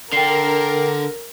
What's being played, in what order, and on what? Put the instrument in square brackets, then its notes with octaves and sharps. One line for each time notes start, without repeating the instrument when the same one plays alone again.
[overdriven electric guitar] D3 [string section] A#4 [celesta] G5 C7